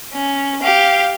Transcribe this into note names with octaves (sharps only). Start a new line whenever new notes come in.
C#4
G4 F5